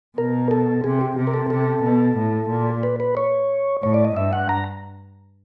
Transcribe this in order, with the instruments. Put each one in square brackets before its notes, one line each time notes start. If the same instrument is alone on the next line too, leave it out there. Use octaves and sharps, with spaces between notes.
[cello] B2 [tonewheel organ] A#4
[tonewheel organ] A4
[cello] C3 [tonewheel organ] G#4
[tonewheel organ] G4
[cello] C3
[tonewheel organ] A#4
A4
[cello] C3 [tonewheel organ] A4
[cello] B2
A2
A#2
[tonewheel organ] B4
B4
C#5
[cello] A2 [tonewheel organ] C#5
[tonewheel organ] D5
D#5
[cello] G2 [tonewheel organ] E5
[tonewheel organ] F#5
A#5